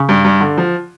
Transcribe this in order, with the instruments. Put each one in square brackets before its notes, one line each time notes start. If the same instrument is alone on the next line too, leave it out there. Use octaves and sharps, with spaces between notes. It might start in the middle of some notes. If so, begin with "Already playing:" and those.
Already playing: [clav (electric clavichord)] C#3
[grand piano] G2
G2
D3
F3